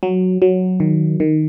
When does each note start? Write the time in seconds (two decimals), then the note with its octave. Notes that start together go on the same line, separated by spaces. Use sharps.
0.03 F#3
0.42 F#3
0.80 D#3
1.20 D#3